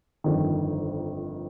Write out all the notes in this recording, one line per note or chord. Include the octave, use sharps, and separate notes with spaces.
G1 F2 D#3